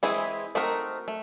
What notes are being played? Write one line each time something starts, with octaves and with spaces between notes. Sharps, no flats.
E3 G#3 C4 E4 G#4
A3 C4 D#4 F#4 A#4
A3